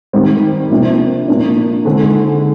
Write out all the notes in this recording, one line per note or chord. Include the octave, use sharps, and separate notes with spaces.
D#3 G3 C4
C3 F3 A#3 D4
A#2 F3 A#3 D4
D3 G#3 C4 D#4